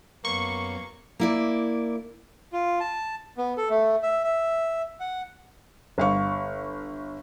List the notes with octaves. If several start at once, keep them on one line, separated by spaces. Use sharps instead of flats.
F#2 A#3 B3 C#5 C#6
A#3 E4 D5
F4
A5
B3
A4
A3
E5
E5
F#5
G1 F5 C#6